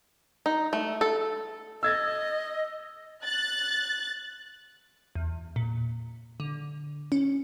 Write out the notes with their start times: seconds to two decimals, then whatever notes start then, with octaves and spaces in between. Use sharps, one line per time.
0.46 D#4
0.73 A3
1.01 A4
1.83 D#5 E6 G#6 A6
3.23 F#6 A6
5.15 E2
5.56 A#2
6.40 D3
7.12 C#4